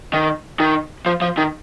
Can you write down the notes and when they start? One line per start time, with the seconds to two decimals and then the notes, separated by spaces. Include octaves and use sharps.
0.13 D#3
0.60 D#3
1.06 F3
1.22 F3
1.38 D#3